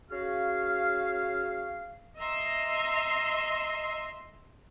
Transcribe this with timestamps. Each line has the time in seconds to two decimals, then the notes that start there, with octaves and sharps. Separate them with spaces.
0.10 C#4 F#4 G#4 F5
2.19 D#5 E5 A#5 C6